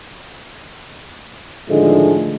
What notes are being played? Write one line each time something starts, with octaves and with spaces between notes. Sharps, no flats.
A2 D3 D#3 F3 G#3 A3